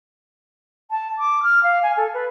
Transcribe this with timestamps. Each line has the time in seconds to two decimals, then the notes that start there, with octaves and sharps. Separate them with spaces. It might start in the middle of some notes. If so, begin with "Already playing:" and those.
0.91 A5
1.18 D6
1.43 F6
1.63 F5
1.83 G#5
1.97 A4
2.14 B4